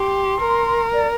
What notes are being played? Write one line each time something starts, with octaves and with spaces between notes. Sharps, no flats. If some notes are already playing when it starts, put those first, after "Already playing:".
Already playing: G4 C6
A#4
D5